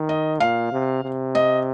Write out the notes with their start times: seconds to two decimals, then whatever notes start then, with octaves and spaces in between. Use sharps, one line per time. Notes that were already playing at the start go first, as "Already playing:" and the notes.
Already playing: D#3
0.09 D#5
0.40 A#2 F5
0.72 C3
1.03 C3
1.35 D#5